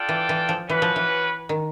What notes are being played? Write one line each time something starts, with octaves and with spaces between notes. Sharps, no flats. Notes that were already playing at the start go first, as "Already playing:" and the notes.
Already playing: D4 F4 A4 D5 G5
E3
E3
F3
E3 C#4 F#4 B4
F3
E3
D#3